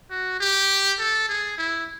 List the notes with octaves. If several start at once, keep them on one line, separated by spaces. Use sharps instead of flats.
F#4
G4
A4
G#4
E4